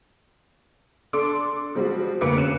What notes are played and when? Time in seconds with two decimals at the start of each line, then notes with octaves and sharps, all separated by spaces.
1.13 D4 A4 C6 D6
1.75 F3 G3 G#3 C4 F#4
2.21 F1 D3 A#3 B4 D6 C#7
2.37 C#4 F#6 D#7 E7